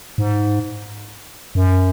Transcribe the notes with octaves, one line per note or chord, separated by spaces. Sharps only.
G#2
F#2